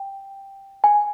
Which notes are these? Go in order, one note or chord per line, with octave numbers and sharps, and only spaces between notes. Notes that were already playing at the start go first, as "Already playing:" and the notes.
Already playing: G5
G#5